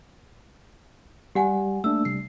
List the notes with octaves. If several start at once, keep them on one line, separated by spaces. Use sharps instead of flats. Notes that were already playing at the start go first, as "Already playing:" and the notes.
G3 G4 F#5 G#5
A3 A#3 D4 E6
C3 G3 C7